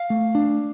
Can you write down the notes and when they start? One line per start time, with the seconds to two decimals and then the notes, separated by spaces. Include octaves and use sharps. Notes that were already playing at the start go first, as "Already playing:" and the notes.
Already playing: F5
0.10 A3
0.35 D4